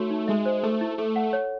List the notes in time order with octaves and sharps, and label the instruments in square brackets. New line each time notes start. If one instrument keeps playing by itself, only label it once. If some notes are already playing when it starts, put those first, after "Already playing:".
Already playing: [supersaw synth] A3 [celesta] D#4 F#4 C#5
[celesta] D#4
[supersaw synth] G#3 [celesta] E5
[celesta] C5
[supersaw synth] A3 [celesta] A4
[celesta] E4
[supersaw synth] A3 [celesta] A4
[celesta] F#5
C#5